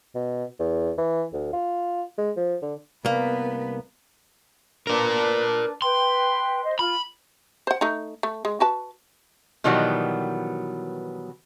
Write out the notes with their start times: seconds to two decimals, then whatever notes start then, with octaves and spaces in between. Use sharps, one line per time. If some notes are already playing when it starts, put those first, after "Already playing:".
0.15 B2
0.60 E2
0.98 E3
1.33 D2
1.53 F4
2.18 G#3
2.36 F3
2.62 D3
3.05 C2 A#3 B3 B4
4.87 D4 A#4 B4 D5
5.82 B4 G5 C6
6.62 C5 D#5
6.79 F4 B5
7.67 C5 F#5
7.81 A3 D#4
8.23 A3
8.45 G#3
8.60 F#4 B4 A5
9.64 B2 D#3 E3 F#3 G3 B3